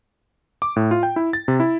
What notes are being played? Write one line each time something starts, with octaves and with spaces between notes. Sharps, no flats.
D6
A2
F4
G5
E4
A6
C3
E4